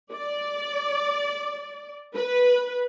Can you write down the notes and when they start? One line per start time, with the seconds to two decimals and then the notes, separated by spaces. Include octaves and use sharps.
0.12 D5
2.15 B4